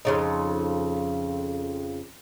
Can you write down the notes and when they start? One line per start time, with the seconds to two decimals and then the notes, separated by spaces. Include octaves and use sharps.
0.05 F2 C#3 D#4